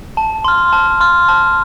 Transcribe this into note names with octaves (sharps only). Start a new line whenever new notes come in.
A5
C6 F6
A5
C6 F6
A5